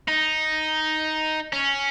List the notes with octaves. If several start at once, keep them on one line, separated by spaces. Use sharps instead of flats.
D#4
C#4